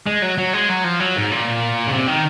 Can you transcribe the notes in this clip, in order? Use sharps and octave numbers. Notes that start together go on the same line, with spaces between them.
G#3
F#3
F#3
G#3
F#3
F3
F#3
G#2
A#2
C#3
C3
D#3